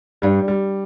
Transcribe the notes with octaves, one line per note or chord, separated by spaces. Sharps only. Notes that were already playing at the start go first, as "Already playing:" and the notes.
G2 G3
G3